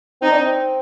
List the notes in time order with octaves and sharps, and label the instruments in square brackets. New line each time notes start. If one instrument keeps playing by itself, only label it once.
[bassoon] C4 [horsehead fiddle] D#4
[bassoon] D4
C4